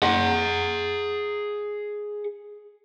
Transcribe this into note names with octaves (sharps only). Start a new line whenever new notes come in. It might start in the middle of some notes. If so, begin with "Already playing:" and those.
G#4 F#5